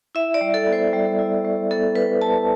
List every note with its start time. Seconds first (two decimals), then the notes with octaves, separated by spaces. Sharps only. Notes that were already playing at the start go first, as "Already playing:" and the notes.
0.15 E4 E5
0.34 D5
0.41 G3
0.54 A4
0.67 B3
0.73 C5
0.93 G3
1.19 E4
1.45 G3
1.70 B3 A4
1.96 G3 B4
2.22 E4 A5